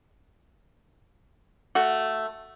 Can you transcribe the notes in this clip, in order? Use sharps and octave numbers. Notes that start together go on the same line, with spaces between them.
A3 F#4